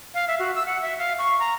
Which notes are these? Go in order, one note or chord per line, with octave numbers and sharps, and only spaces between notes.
F5
E5
F#4
E6
F#5
E5
F5
C#6
A#5